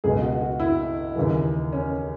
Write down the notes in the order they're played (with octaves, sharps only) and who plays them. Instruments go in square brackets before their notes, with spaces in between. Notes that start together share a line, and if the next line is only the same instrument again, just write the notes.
[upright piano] C#2 B2 G#4
F#4
F#4
E4
D#2 C#3 E3
C#4